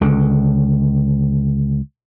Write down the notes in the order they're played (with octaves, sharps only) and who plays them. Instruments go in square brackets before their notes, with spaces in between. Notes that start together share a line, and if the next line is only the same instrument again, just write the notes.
[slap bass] C#2 D3